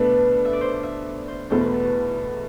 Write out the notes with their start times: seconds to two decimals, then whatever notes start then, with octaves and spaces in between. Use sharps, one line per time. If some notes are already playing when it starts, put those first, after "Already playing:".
Already playing: B2 A3 D4 A4 B4
0.45 E5
0.53 D5
0.61 C5
0.83 E5
1.28 C5
1.50 E2 B2 A3 C5
1.61 B4
1.73 A4
1.85 F#4